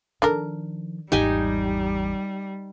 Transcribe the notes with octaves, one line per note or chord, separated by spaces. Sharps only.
D#3 F3 D4 A4 A#4
G#1 E2 G3 D#4 G4 G#5